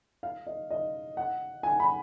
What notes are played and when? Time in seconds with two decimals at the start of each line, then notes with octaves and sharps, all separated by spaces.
0.23 F5
0.47 D#5
0.70 D#5
1.17 F#5
1.63 G#5
1.80 B5